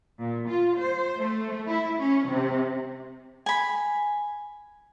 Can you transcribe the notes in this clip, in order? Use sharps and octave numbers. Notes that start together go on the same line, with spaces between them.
A#2
F4
C5
A3
E4
C#4
C3
G#5 B5